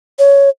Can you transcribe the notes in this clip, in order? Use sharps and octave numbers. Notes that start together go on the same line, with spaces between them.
C#5